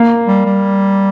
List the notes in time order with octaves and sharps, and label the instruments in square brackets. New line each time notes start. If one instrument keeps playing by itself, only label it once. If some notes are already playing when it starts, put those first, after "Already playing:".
Already playing: [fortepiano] A#3
[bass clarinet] G3
G3